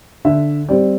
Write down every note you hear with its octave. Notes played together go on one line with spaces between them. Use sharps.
D3 E5
G3 C4 D5